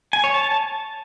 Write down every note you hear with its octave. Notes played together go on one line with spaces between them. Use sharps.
G#5
C#5
A5